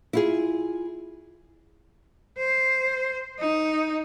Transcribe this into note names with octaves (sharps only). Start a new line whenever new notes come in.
E4 F4 G#4
C5
D#4